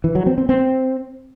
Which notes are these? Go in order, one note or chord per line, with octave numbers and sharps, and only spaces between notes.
E3
F#3
C4
C4
C4